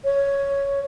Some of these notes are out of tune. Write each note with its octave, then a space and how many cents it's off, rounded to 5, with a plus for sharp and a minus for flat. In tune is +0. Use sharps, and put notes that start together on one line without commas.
C#5 +5